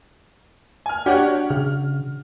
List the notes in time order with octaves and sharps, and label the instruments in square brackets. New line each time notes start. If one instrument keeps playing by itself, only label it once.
[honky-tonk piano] G#5 F6
[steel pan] D4 F#4 [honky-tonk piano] G4 C#5 F#5
[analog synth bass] C#3 [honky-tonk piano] F6